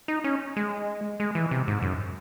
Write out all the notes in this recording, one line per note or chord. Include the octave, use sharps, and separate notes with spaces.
D#4
C#4
G#3
G#3
E3
C3
G#2
F#2